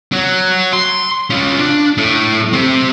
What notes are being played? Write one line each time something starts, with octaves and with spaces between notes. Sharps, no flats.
F#3
C6
C#4 F4
D4
A2
C4 G4